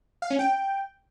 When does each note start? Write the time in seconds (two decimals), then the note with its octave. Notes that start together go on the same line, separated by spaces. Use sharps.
0.22 F5
0.31 C#4
0.39 G5